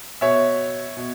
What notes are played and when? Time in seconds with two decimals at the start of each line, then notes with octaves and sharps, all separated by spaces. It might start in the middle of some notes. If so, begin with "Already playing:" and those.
0.21 B2 C#5 E5
0.96 B2